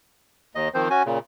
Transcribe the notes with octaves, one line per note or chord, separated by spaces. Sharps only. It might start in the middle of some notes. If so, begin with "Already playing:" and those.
D#2 D#5
D#3 F3 C4 C5
C#4 F#4 G#5
A#2 C#3